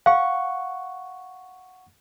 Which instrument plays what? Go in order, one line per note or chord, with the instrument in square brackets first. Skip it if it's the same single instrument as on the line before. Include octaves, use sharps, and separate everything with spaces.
[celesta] F5 [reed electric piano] F#5 C#6